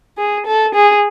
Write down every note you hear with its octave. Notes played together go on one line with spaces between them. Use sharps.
G#4
A4
G#4